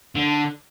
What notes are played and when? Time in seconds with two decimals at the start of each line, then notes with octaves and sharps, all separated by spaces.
0.15 D3